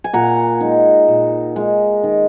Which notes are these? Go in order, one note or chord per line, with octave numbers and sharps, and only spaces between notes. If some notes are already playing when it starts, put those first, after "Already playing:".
G#5
A#2 F#5 A#5
G#3 D#4
A#2
G#3 D#4
D#3